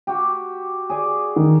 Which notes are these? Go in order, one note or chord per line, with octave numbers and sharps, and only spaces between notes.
F#4 G4
G#4 D5 G#5
D#3